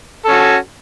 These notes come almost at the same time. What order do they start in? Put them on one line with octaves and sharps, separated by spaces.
A4 C#4 F#4